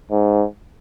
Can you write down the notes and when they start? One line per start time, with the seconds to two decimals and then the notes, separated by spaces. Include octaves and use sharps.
0.11 G#2